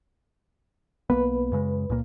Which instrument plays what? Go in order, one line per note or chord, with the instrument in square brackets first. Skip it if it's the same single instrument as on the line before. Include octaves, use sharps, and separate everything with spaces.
[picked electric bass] B1 A#3 B3 [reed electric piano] B4
[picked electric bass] F#2 C#3 G#3
C#2 A#2 A#3